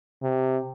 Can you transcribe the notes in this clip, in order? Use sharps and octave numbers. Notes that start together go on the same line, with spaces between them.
C3